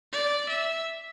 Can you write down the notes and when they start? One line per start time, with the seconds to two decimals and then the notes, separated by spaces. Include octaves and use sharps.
0.12 D5
0.49 E5